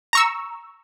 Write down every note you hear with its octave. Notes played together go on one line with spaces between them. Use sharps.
A#5 C#6 E6